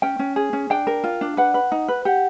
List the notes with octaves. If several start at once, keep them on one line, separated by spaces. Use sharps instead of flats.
C#4 G5
C#4
G#4
C#4
D4 G5
A#4
F4
D4
B4 F#5
B4
D#4
B4
G4 F#5